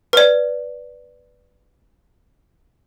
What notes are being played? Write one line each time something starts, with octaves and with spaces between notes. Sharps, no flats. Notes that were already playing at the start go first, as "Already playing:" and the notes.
B4 D5